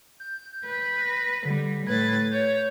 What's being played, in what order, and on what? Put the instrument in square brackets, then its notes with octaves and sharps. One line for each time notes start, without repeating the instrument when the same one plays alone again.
[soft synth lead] G6
[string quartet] B4
[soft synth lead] A#6
[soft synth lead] D3 [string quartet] G3
[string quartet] A2 B4 A6 [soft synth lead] G#6
[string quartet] C#5 [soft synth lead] G6